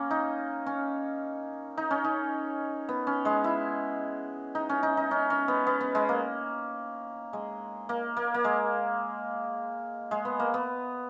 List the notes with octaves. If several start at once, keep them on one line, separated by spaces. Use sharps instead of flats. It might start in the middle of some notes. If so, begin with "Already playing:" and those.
Already playing: A#3 C#4
D#4
C#4
D#4
C#4
D#4
B3
C#4
G#3
E4
D#4
C#4
D#4
D#4
C#4
C#4
B3
B3
B3
G#3
A#3
G#3
A#3
A#3
A#3
G#3
G#3
B3
A#3
B3